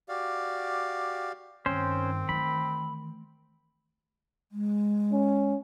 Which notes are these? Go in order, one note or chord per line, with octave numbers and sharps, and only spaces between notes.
F#4 G4 D5 F5
G2 D#3 C4 C#4 C5
E3 A3 B5
G#3
C#4